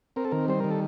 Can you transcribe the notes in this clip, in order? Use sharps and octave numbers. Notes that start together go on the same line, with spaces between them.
C4 A#4
A4
D#3 A#4
G3 C5
D#3 A#4
A4